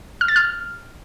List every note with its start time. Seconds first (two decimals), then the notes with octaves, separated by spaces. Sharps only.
0.21 F6
0.28 A6
0.36 F6